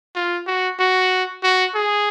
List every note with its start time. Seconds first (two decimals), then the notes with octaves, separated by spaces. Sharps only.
0.15 F4
0.46 F#4
0.79 F#4
1.43 F#4
1.75 G#4